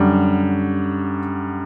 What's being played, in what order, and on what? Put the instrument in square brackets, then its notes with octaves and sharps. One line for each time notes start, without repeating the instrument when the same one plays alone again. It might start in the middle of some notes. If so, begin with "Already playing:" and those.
Already playing: [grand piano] F#2 D3 G3